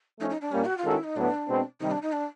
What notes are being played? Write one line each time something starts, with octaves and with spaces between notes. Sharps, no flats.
F3 A3 C#4 D#4
D#4
D4
A#2 G3 A#3 C#4
F#4
F4
D#3 G#3 C#4 F#4 A4
E4
D#4
A2 F#3 B3 D4
B2 G#3 C4
C3 D#3 G3 D#4
D4
D#4
D4